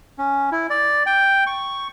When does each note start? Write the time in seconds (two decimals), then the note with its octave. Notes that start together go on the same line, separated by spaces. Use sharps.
0.18 C#4
0.52 E4
0.70 D5
1.06 G5
1.47 C#6